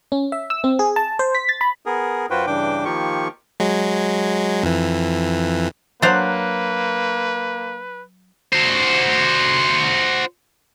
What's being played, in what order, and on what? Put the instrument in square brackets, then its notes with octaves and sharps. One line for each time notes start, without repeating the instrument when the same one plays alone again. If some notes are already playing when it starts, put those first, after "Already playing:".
[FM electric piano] C#4
E5
E6
C4
G#4
A5
C5
B6
A6
B5
[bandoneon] B3 G#4 A#4
F#2 F4 F#4 B4 C5 G5
G2 C#3 E3 D4 G5 D6
D#3 F3 A#3 F4 G4 C#6
[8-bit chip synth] F#3 G#3
F2 E3
[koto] F#3 C5 [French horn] A#3 [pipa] D4 F#5 [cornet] B4
[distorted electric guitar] F#4 C5